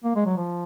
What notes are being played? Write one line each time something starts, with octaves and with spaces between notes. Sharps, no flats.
A#3
G#3
F#3
F3